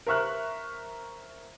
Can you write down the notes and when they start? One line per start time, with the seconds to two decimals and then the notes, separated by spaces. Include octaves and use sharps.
0.07 A#4 C5 E5 C#6 F6 F#6